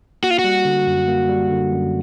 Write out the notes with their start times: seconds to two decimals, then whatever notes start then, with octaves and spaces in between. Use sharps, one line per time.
0.23 A#3 F#4
0.30 F4
0.39 F#4
0.44 G3
0.65 D3
0.87 F#2
1.08 A#3
1.29 G3
1.50 D3
1.72 F#2